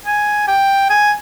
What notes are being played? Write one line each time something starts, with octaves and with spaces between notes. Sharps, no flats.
G#5
G5
G#5